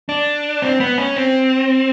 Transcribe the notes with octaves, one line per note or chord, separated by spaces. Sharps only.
D4
C4
B3
C#4
C4